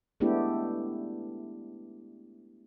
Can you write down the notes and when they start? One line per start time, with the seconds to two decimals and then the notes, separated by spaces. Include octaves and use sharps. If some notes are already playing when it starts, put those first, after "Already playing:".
0.20 G#3 A3 B3 D4 E4 G4